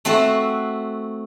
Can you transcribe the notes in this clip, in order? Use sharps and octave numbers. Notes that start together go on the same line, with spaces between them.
A3 C4 F#4 A4